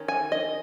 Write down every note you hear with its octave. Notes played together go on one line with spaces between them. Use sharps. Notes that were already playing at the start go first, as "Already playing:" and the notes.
Already playing: D#3 C#4
G#5
D#5